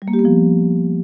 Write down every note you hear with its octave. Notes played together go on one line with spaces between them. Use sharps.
G3
A#3
G4
B3
F3